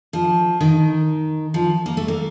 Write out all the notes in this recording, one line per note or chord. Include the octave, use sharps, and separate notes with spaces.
F3
D#3
F3
A#3
A3
A#3